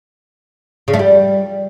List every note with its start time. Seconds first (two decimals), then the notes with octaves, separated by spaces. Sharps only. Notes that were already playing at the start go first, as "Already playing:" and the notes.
0.88 C#3
0.94 A3
0.99 G3